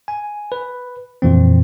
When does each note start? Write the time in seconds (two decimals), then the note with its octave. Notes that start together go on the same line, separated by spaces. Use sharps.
0.08 G#5
0.52 B4
1.22 F2 A#2 E3 C4